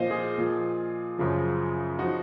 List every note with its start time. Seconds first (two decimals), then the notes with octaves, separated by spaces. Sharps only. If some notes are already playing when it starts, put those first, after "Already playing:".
Already playing: A#2 F3 C5 D#5 F5
0.11 F4 G#4
0.38 A#2 F3
1.18 F#2 C#3 F3
1.99 F3 D#4 F#4